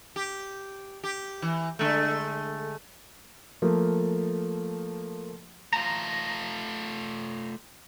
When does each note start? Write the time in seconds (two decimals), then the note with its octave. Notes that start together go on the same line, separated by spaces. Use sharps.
0.16 G4
1.04 G4
1.42 E3
1.79 D3 G#3 A3
3.62 F3 A3 A#3
5.73 A3 F4 A#5